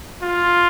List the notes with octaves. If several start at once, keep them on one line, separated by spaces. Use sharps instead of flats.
F4